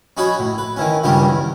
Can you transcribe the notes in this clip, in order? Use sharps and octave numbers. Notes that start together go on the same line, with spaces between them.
C#4 D#4 F#4 C#5 F#5 B5
A2
B4
D#3 E3 C#4
C#2 G2 D#3 G3 C#4 G4
E2